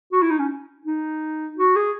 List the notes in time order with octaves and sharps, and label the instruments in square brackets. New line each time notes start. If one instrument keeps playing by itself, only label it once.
[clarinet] F#4
E4
D#4
C#4
D#4
F#4
G#4